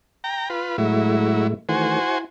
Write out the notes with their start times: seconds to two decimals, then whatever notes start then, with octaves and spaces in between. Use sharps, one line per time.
0.24 G5 A#5
0.50 F4 B4
0.78 A2 F#3 G#3 A3 E4
1.69 D#3 E3 A3 F#4 C5 G#5
2.01 E4